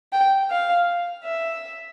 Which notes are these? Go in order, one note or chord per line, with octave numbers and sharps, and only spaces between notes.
G5
F5
E5